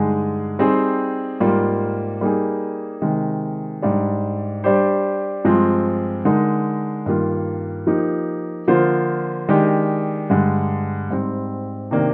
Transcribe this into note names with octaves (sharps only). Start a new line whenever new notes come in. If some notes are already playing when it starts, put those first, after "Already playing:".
Already playing: G2 D3 G#3 D#4 G#4
G3 C4 D#4 G#4 C5
G#2 G3 A#3 F4
G3 A#3 D#4 G#4
C3 D#3 G#3
G#2 G3 D4
G3 D4 G4 C5
G2 F3 G#3 C4 F4
D3 G#3 D#4 A#4
G2 D#3 A#3 F4
F3 A#3 D#4 G4
D3 F3 A#3 F4 C5
D#3 G#3 D4 G4
G2 D3 G#3
G#2 G3 C4
C3 D#3 A#3 D4